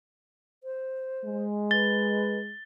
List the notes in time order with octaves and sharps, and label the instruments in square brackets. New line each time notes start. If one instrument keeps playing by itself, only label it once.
[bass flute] C5
[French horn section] G#3
[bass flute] B4 [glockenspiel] A6 G7